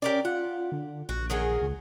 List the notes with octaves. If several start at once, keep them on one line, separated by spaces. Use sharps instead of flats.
C#4 G4 A#4 D5
F4 F#5
D3
A#1 F#4
D#3 F#3 G#4
C#2